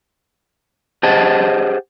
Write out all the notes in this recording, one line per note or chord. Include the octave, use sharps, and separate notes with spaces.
G4 G#4 C5 D#5 F#5 A5